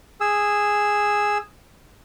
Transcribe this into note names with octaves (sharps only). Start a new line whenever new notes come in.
G#4 E6